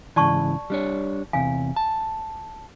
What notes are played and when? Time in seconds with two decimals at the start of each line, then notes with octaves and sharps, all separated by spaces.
0.16 G#2 C#3 E3 D5 A5 C#6
0.70 G3 D4 C#5
1.33 E2 C3 F5 G#5
1.76 A5